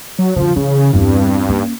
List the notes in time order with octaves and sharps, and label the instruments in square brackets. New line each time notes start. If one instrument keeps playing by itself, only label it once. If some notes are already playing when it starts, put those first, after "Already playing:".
[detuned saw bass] F#3
[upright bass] F#2 D3 [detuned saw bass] F3
[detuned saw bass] C#3 [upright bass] E3
[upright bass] E2 C4 [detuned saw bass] G2
[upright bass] A#3 C#4